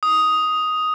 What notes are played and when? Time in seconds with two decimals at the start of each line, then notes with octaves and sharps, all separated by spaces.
0.03 D#6